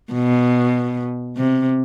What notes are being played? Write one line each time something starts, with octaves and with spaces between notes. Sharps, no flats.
B2
C3